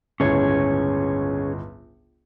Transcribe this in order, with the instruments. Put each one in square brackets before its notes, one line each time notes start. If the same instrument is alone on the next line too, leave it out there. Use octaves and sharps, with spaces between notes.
[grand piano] G1 C#2 A2 [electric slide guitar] C#4 G#4 C#5